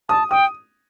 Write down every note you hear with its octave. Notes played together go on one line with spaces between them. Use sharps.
A5 D#6
G5 D#6